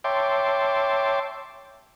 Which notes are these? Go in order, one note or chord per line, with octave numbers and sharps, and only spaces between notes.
C#5 E5 G5 A5 C6 D6